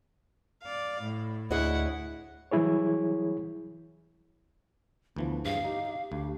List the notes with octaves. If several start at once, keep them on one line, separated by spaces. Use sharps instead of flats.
D5 F5
A2
D2 E4 G#4 C#5 D#5 F#5
E3 F#3 G3 E4 G#4 C#5
D2 E3 F3 B3
G2 G#4 F5
D#4 G4
G4
D2 G4